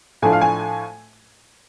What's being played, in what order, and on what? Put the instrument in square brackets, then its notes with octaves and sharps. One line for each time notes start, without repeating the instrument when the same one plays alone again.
[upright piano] A2 F3 A3 D4 G#5
F5
G#5